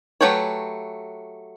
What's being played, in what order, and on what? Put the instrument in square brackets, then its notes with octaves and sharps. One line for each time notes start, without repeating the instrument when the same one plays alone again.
[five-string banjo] F#3 A3 G4 B4 C#5